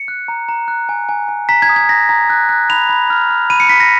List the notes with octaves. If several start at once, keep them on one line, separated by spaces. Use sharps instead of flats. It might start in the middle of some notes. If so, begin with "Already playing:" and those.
Already playing: C#7
F#6
A#5
A#5
F#6
G#5
G#5
G#5
A#5 B6
G#6
D#6
G#6
A#5 A#6
A#5
F#6
F#6
B5 F7
B5
F6
F6
B5 D#7
C#7
B5 B6
A#6